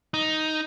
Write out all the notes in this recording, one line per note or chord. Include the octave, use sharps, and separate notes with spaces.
D#4